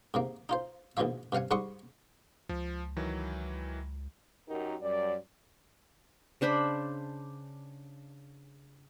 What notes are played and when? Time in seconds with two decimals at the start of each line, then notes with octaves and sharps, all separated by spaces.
0.14 G#2 C3 A#3
0.49 D#4 F4 C5
0.97 A#1 G#2 B2 E3 F3 E5
1.32 G2 C3 F5 F#5 G#5
1.51 G#2 G3 F#5 C6 C#6 D#6
2.49 C#2 F3
2.96 D#3 E3 F#3
4.48 F#2 D#4 F#4 G4 A#4
4.81 F#2 G3 D5
6.41 C#3 D4 C5 B5